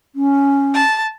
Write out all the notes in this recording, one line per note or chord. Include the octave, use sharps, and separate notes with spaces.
C#4
A5